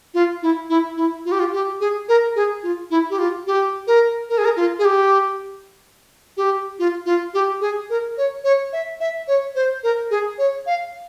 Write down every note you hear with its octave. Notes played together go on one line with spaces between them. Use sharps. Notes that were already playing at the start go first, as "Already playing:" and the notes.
F4
E4
E4
E4
F4
G4
F4
G4
G#4
A#4
G#4
F4
E4
G4
F4
G4
A#4
A#4
G#4
A#4
F4
G#4
G4
G4
F4
F4
G4
G#4
A#4
C#5
C#5
E5
E5
C#5
C5
A#4
G#4
C#5
F5